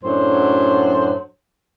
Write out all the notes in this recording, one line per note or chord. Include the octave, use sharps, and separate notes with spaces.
F#2 A2 F#3 D4 C5